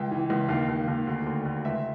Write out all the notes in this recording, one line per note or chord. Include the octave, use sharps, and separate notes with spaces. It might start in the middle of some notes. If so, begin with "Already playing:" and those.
Already playing: C#2 G5
E3
C#2
D#2 F5
D#2
D#2
D2
D2
D2
C#2 E5